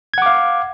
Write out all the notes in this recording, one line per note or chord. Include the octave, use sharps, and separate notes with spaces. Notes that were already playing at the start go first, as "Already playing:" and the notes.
F5 F#5 D6 G#6